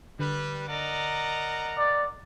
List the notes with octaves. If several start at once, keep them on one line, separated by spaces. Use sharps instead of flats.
D3 G3 B4
A#4 D5 D#5 F#5 A#5
D5